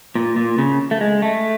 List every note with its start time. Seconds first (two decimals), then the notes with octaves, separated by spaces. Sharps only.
0.15 A#2
0.36 A#2
0.58 C#3
0.91 A3
1.01 G#3
1.22 A3